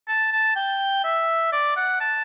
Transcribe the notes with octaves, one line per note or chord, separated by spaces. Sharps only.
A5
A5
G5
E5
D5
F#5
A5